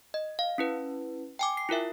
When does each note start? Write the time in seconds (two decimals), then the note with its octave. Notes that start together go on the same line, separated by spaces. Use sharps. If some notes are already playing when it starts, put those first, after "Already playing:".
0.14 D#5
0.39 F5
0.58 C#4 E4 B4
1.39 G5 G#5 D6
1.57 C7
1.69 E4 F4 A#4 E5